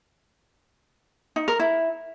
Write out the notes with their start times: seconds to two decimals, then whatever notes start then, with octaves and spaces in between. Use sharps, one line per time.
1.36 D#4
1.48 A#4
1.59 E4